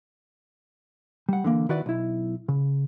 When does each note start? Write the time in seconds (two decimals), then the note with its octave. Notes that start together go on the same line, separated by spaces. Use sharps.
1.29 G3 F#5
1.44 D3 E3 A#3
1.69 D#3 E4 F#4 B4 D5
1.86 B1 E4
2.48 C#3